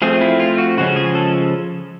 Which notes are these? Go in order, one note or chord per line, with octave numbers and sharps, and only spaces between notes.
F3 A3 C4 G#4
E4
F4
F#4
C#3 F3 G#3 C#4 F#4
G#4
A4